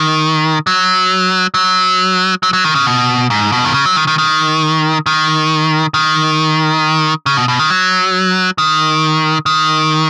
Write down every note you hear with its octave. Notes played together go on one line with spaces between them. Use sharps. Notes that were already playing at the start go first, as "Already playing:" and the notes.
Already playing: D#3
F#3
F#3
F#3
F#3
D#3
C#3
B2
G#2
B2
D#3
C#3
F#3
D#3
D#3
D#3
D#3
D#3
C#3
B2
B2
D#3
F#3
D#3
D#3